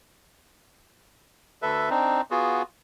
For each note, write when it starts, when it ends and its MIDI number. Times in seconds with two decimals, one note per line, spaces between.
1.62 1.90 38
1.62 1.90 69
1.62 1.90 71
1.62 1.90 76
1.90 2.21 60
1.90 2.21 62
1.90 2.21 63
2.31 2.62 59
2.31 2.62 65
2.31 2.62 66
2.31 2.62 68